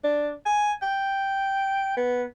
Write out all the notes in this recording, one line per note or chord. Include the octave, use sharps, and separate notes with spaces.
D4
G#5
G5
B3